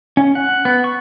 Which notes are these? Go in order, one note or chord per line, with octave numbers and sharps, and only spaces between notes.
C#4
F#5
B3
C#6